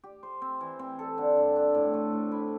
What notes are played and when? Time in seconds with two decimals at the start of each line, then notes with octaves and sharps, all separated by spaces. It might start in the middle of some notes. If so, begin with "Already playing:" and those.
0.04 G4
0.23 C5
0.42 C4
0.61 E3
0.79 C4
0.99 A4
1.18 D3
1.36 G2
1.56 D4
1.74 A2
1.94 A3
2.13 A2
2.32 E4